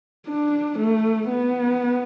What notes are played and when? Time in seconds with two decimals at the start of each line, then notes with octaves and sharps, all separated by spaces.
0.27 D4
0.79 A3
1.30 B3